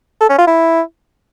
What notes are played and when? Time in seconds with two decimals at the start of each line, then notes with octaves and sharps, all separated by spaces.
0.21 A4
0.30 C#4
0.38 F4
0.47 E4